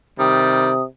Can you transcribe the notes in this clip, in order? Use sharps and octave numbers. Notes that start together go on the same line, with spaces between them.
C3 D#3 G3 D#6